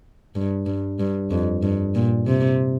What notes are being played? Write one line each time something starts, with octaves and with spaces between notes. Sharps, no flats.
G2
G2
G2
F2
G2
A#2
C3